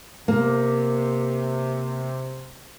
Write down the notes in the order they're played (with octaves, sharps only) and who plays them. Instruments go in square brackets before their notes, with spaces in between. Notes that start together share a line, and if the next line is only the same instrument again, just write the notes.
[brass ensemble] C3 [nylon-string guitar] A#3